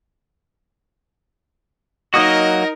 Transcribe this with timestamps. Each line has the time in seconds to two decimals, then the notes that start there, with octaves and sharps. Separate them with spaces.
2.14 F#3 A#3 D#4 F#4 A#4 D#5